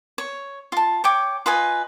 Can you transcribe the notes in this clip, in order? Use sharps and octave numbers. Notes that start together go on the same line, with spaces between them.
C#5
F4 A5
C#5 G5 D6
F4 B4 D#5 G#5